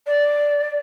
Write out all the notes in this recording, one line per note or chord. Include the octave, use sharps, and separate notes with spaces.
D5